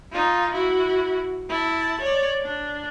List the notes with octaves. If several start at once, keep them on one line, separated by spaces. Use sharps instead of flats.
D#4 F4
E4 F#4
E4 A5
C#5 D5
D4